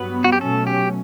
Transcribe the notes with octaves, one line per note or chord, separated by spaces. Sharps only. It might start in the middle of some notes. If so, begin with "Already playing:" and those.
Already playing: G2 F#3 B3 B4
F#4
G4
B2 F#3 A3 C#4 A4
G4